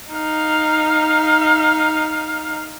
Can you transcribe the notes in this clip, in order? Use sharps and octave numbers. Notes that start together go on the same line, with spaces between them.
D#4 F5